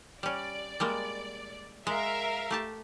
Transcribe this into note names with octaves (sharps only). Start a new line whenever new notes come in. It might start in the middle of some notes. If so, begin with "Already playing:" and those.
G3 C#4 D5
G3 G#3 A#3
G#3 A#4 E5 F5
A3 G4 A5